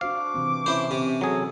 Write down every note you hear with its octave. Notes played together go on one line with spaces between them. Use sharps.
D4 F#4 C5 F5 D6
C3 E3 C4
C#4 E4 C5
C3
F#3 G#4 A4